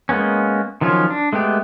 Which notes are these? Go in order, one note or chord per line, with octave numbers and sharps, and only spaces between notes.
G#3 A#3 B3 C#4
D#3 F3 F#3 C#4 F4
D4
G#3 A3 B3 G4